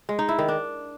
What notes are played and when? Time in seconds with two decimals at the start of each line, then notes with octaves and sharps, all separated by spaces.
0.09 G#3
0.19 D#4
0.29 E4
0.39 D#3
0.48 D4